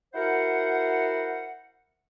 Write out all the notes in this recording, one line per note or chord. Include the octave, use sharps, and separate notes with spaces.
E4 F#4 A#4 C5 F#5